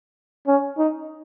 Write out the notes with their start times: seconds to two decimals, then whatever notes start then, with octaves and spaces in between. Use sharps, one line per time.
0.47 C#4
0.78 D#4